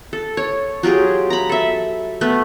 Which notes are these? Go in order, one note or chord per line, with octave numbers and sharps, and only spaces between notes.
A4
C#5
F#3 F4 G4 G#4
A#5 B5
A4 E5
A3 B3 B4